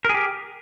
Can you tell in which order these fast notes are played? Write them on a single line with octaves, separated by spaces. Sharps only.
A#4 G#4 G4